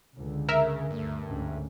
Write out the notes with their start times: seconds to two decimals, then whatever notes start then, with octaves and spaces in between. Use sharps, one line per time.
0.16 C#2 G2 D3
0.49 C#3 A#4 E5
0.91 D2 G2 A3
1.23 D2 G#2 C#3